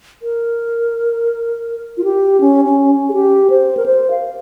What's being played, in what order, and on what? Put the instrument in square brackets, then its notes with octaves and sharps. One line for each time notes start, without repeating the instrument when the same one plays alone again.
[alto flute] A#4
F4
G4
C#4
C#4
G#4
G4
C5
A#4
C5
F5